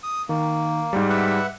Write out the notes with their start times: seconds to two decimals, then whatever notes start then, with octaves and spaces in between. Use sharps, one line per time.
0.03 D#6
0.29 D#3 A#3
0.93 G#2 G3
1.10 B4 E5 F#5